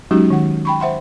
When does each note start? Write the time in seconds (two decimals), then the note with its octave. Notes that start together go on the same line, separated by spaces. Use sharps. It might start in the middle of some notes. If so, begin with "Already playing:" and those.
0.11 F#3 G#3 C#4 D#4 F#4 G4
0.30 D#3 F#5
0.65 G5 B5 C#6
0.80 C5 E5 F#5 C6